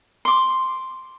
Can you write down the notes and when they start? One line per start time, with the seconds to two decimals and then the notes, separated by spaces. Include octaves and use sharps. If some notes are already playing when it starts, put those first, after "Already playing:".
0.25 C6 D6